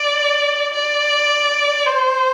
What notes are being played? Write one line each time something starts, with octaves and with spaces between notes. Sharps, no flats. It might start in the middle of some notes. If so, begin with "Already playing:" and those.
Already playing: D5
D5
C5